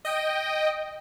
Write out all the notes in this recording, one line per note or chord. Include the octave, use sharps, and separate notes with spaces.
D#5 G5